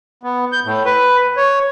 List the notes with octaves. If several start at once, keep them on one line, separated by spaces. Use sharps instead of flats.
B3
G6
A2
B4
C#5